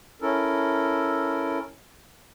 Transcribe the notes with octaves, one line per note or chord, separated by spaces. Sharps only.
C#4 E4 A4 A#4